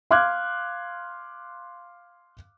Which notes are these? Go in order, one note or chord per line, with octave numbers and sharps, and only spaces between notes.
F5 C6 D6 F6 F#6 G#6